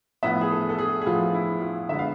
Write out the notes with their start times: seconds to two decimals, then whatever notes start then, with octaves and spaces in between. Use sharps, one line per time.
0.23 A2 F3 B3 E5
0.41 G#4
0.51 A4
0.69 A4
0.79 G#4
1.02 G#4
1.06 A2 F3 B3 F4
1.34 E4
1.61 F4
1.89 D3 G#3 B3 E5
1.99 F5